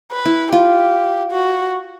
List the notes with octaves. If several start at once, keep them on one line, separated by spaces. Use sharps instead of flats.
B4
E4
F4 G4
F#4